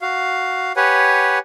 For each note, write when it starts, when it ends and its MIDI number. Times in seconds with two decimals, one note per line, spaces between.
0.01 0.72 66
0.01 0.72 77
0.76 1.39 67
0.76 1.39 71
0.76 1.39 73
0.76 1.39 78
0.76 1.39 80